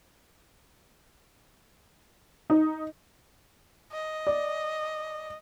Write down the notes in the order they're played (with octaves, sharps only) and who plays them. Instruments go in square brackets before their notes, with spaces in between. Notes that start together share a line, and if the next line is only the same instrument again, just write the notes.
[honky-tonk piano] D#4
[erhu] D#5
[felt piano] D5